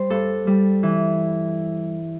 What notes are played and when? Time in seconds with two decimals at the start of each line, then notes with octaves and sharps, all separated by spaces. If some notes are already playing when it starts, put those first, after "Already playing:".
Already playing: G3 C5
0.10 G2 A4
0.47 G3
0.83 E3